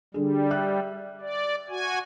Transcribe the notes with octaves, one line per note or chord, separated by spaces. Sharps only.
D3 G3 G#4
E5 F#6
D5
F#4 G#5